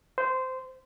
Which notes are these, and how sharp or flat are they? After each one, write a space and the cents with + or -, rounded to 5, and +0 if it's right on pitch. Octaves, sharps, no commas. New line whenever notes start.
C5 -15